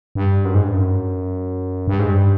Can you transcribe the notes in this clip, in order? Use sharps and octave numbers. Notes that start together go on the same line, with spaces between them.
G2
F#2
G#2
G2
F#2
G2
G#2
G2